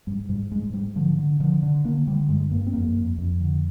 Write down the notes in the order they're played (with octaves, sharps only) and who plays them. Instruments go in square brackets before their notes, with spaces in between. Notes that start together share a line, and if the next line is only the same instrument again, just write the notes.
[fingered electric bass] G#2 G3
G#2 G3
G#2 G#3
G#2 G3
D3 F3
D3
D3 F3
D3
D3 A#3
D3 G3
G2 G#3
G2 A#3
C4
F2 A#3
F2
F2
D3